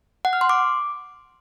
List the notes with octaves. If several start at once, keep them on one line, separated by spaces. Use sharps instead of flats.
F#5
F6
C6
D6